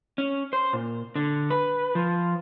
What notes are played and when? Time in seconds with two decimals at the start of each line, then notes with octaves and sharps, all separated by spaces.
0.18 C#4
0.53 C5
0.73 A#2
1.16 D3
1.50 B4
1.95 F3